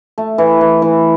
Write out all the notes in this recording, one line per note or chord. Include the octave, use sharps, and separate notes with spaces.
A3
E3
E3
E3